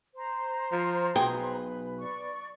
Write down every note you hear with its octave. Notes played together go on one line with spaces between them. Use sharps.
C5 A#5
F3
B1 G#4 B4 G5
D5 C#6